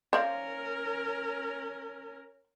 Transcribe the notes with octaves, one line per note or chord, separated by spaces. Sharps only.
C#4 A#4 C5 D5 F5